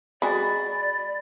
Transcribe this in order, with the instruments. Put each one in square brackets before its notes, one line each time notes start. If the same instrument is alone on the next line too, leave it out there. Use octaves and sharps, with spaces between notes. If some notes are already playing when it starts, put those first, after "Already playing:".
[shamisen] G#3 F#4 G#4 [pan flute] D5 [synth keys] B5